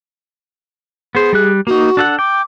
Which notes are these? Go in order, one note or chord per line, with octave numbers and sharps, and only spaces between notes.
B3 G#4 C5
G3 G4 F#6
A#3 D#4 F#4
D4 A4 F#5
G5 D6